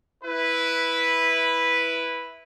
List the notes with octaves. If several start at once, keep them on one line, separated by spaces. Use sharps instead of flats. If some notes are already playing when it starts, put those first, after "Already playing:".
E4 B4